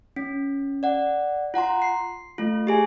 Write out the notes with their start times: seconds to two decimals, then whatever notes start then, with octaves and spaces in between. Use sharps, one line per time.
0.16 C#4
0.83 D5 F#5
1.54 F4 F#5 A#5 C6
1.82 C7
2.38 A3 F4
2.67 G4 G#4 G#5